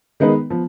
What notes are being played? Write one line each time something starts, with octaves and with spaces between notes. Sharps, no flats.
D#3 G#3 B3 D#4 B4
F3 B3